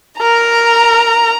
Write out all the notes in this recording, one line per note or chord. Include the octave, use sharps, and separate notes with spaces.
A#4 A#5